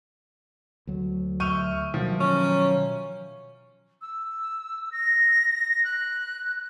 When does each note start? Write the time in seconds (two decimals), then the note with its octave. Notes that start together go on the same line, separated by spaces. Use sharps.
0.87 D2 F#3
1.40 E5 C#6 F6 G6 D#7
1.94 B2 D#3 F3 F#3
2.20 C#4 C#5 A#5
4.01 E6
4.92 A#6
5.84 F#6